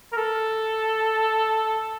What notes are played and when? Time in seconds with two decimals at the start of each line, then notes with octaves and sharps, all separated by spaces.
0.13 A#4
0.17 A4